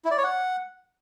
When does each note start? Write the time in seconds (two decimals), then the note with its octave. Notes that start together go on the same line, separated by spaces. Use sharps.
0.05 E4
0.11 D5
0.18 C#5
0.24 F#5